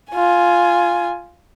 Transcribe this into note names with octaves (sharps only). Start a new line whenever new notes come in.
F4 G#5